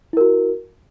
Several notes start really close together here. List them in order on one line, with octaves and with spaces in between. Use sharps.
E4 A#4 F#4